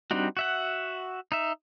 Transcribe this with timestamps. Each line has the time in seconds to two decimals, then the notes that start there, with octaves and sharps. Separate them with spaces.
0.11 G3 C4 D4 D#4 F#4
0.37 F#4 E5 F#5
1.32 D#4 E5